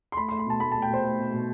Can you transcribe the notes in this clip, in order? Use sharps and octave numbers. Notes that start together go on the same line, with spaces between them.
C6
A3 B5
A3 C6
B5
B2 A5
A3 B5
A3 A5
G5
B2 C5
A3
B2
B2